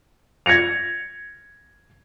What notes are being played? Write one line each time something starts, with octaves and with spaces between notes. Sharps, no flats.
G#6 A#6 C#7 F7